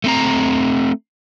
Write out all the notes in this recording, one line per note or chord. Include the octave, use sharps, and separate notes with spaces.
A3 C4 A#5